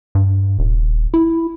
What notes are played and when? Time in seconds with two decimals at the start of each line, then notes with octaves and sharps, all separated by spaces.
0.15 G2
0.59 D#1
1.14 E4